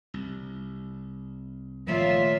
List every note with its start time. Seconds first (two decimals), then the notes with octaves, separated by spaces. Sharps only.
0.14 C2
1.87 A#2 D#3 F3 F#3 A3 B3 F4 E5